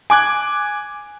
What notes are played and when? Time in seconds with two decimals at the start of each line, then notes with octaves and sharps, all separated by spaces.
0.10 G#5 D6 F#6 G#6